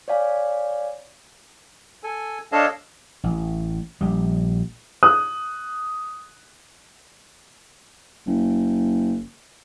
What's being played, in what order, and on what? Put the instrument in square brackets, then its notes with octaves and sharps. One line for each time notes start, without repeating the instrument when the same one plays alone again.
[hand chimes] C#5 D5 F5 G#5
[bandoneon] A4 G#5
D4 A4 C#5 D#5 F5 A5
[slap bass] A1
A#1 G3
[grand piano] D#6 F#6
[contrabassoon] F#1